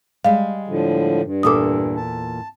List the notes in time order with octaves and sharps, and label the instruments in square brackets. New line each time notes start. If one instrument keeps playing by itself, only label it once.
[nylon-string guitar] G3 G#3 [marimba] F5
[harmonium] A2 D3 F3
G2
[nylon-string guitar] E2 A#2 A4 [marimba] D6 D#6
[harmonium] A5